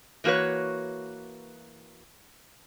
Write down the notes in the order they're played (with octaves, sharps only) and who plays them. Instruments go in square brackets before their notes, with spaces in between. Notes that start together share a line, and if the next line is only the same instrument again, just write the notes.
[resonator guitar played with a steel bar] E3 A#3 F#4 B4 C#5